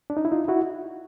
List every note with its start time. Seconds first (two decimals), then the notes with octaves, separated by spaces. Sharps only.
0.10 D4
0.17 D#4
0.25 E4
0.32 D#4 F4
0.48 E4 F#4